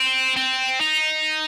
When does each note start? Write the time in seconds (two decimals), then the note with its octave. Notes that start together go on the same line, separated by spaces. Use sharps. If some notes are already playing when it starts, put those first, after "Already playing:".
Already playing: C4
0.36 C4
0.80 D#4